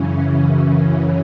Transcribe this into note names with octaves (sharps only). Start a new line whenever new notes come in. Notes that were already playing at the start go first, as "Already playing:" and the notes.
Already playing: F#2 C#3 E3 C#4